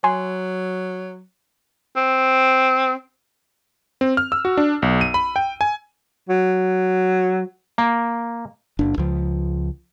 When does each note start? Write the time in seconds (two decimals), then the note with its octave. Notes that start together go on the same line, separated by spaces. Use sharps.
0.04 F#3 G#5 C6
1.96 C4
4.01 C4
4.17 F6
4.32 E6
4.45 F#4
4.57 D4
4.82 B1
5.01 D#7
5.14 B5
5.36 G5
5.61 G#5
6.29 F#3
7.78 A#3
8.79 F#1 D4
8.98 C#2 F3